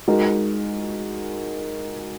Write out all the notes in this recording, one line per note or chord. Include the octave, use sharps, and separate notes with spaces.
G#3 D#4 F#4 A#4